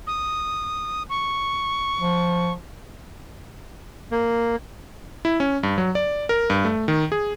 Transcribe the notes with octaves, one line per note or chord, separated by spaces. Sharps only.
D#6
C#6
F3
A#3
E4
C#4
G2
F#3
D5
A#4
G2
A3
D#3
G#4